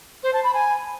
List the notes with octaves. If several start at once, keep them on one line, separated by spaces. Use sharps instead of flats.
C5
A5
B5
G#5